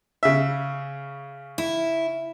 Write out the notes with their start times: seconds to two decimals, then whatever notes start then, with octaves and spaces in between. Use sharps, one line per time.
0.23 C#3 E5
1.58 E4